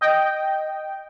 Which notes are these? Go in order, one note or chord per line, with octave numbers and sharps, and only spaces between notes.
D#5 G5